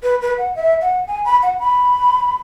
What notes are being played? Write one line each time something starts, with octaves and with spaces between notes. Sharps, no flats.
B4
B4
F#5
E5
F#5
G#5
B5
F#5
B5